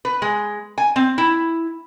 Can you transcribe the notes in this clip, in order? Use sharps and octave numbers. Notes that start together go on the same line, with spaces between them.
B4
G#3
G#5
C4
E4